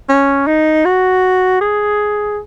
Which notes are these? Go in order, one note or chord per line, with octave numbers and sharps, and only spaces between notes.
C#4
D#4
F#4
G#4